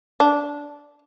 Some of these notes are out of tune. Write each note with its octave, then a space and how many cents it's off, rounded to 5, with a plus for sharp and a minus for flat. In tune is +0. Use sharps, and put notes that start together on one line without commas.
D4 -10